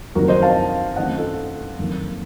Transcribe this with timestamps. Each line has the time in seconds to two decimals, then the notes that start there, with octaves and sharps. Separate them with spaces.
0.15 F#1 F2 D#3 F#4 A#4
0.28 C5 D#5
0.42 F5 A5
0.96 F#2 D#3 A3 C4 D#5 F#5
1.17 F4 A4
1.79 F#1 F2 D#3 A#3